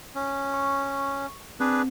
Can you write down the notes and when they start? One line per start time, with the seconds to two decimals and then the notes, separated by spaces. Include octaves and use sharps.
0.15 C#4
0.54 C#6
1.60 C4 D4 G#4 B4